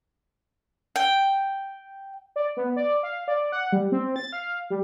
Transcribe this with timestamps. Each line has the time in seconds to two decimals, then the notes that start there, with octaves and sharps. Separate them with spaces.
0.96 G5
2.36 D5
2.57 B3
2.76 D5
3.03 F5
3.28 D5
3.52 F#5
3.72 G3
3.92 C4
4.16 A6
4.33 F5
4.70 G3